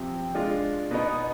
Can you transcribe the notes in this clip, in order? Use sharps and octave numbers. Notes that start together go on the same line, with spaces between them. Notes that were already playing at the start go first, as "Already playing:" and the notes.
Already playing: C3 F3 C4 G4
G#3 D4 F4
B2 B3 D#4